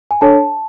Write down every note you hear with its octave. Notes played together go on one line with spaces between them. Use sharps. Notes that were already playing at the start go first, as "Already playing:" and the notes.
G#5
D4 A4 C#5 A5